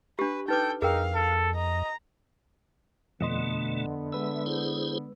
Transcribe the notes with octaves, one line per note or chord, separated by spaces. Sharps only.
D4 G4 B4
D#4 A4 B4 G5 D6
F2 D#4 G#4 A#4 F5 G5
A4
D#5 A#5
F2 B2 D3 A3 B3 D#5 C6
G#3 B4 E5 E6
E4 G#4 C5